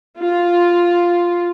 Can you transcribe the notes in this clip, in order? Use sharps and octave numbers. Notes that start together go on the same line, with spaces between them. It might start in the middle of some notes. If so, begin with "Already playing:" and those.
F4